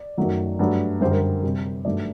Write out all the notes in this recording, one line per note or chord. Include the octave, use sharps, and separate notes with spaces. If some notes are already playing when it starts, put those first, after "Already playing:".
Already playing: D5
F#2 D#3 F#3 A3
G2 F#3 A3
F#2 D3 G3 C5
A#4
C5
C3 G3
G2 D#3 F#3 A3 D5